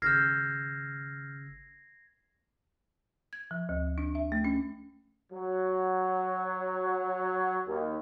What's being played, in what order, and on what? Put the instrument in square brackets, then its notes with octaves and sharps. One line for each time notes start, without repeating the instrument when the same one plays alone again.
[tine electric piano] G#1 C#3 E6 [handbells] F6 G6 [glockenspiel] G#6 A#6 C7
[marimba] G#6
F3
D2
D4
E5
A3
C#4
[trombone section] F#3
D#2